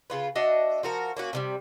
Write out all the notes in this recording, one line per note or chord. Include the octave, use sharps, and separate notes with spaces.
C#3 F4 B4
D4 F#4 D#5 E5
F3 F#4 A#4
A#3 C#4 F#4
C3 D#3 G3